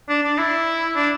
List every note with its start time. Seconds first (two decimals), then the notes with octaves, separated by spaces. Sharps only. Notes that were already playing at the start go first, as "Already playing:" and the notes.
0.09 D4
0.23 D4
0.38 E4
0.96 D4